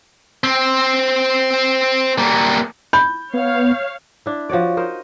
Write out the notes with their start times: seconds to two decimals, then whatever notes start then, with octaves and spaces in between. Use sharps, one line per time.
0.44 C4
2.18 G3 A#3
2.93 B5 G6
3.34 B3 C#5 F5
4.26 D4 E4
4.49 F3 F#4 C#5 D5
4.77 D#4 A#4 C5 D#5